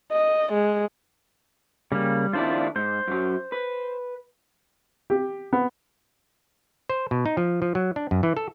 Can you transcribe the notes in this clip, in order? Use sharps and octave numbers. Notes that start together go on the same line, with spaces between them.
D#5
G#3
C#3 G3 A#3
D#2 D4 E4 F4 C5 D5
G#2 C5
F#2 F#3
B4
G4
B3
C5
B2
D#4
F3
F3
F#3
D4
F#2
E3
A4